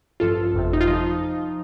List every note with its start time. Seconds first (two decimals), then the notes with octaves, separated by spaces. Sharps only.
0.20 A1 G2 F3 F4 A4
0.54 G1 F2 C3
0.73 D#4
0.81 F4
0.88 F3 D#4